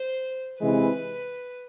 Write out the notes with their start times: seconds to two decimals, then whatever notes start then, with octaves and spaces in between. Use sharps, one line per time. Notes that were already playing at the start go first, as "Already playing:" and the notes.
Already playing: C5
0.61 C3 E3 G#3 C4 E4 B4